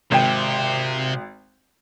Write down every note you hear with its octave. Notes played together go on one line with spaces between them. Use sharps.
G#1 C3 G5